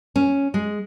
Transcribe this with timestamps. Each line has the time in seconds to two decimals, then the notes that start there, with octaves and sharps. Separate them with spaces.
0.16 C#4
0.54 G#3